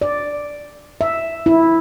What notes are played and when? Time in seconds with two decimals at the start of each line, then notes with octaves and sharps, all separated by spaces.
0.02 D5
1.01 E5
1.46 E4